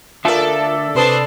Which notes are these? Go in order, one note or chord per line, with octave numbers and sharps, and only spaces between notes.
D3 F4 A4 A#4 D5 E5 A5
C3 D4 B4 C5 D#6